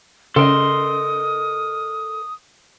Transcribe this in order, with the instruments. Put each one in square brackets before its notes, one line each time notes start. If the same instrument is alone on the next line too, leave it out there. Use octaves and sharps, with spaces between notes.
[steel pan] C#3 [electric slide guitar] A4 A#4 D#5 [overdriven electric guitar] C6 [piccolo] D#6